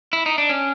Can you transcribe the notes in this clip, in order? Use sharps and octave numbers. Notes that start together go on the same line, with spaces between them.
E4
D#4
D4
C#4